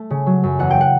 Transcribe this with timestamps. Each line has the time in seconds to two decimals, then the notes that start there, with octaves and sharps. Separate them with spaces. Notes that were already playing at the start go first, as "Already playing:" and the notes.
Already playing: A3
0.10 C#3
0.26 F#3
0.44 F#2
0.59 E2 F#5
0.71 G5
0.81 F#5